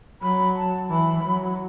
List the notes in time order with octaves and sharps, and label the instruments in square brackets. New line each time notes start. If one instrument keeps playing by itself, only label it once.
[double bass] F#3 [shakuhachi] B5
[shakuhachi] A5
[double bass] E3 [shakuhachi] B5
[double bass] F#3